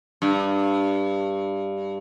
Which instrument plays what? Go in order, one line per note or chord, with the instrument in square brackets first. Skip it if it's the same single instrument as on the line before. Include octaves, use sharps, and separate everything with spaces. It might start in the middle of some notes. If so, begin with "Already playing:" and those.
[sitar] G2